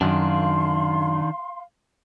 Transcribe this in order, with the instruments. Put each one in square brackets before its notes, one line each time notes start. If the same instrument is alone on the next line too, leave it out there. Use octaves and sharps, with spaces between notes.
[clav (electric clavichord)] F#2 [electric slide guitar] D#3 D4 [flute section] F5 C6